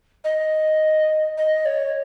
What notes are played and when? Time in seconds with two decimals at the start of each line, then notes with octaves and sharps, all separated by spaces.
0.24 D#5
1.37 D#5
1.65 C#5